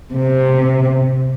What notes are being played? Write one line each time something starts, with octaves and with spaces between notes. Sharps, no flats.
C3